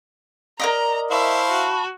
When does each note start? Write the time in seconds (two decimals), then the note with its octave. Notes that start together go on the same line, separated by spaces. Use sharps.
0.60 A#4 D5 D#5 A#5
1.11 E4 C5 E5 F5 A5 B5 C#6
1.50 F#4